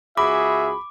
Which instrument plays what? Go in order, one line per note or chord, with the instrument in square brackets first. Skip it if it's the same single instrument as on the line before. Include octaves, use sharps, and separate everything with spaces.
[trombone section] C#2 F#4 G#4 [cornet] E5 [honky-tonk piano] B5 [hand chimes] D6